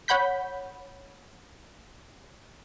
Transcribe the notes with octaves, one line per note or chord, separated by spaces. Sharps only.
C#5 F#5 B5 G6 B6